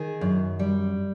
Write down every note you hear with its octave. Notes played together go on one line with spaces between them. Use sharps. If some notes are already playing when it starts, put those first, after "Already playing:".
Already playing: D#3 G#4
F#2
G3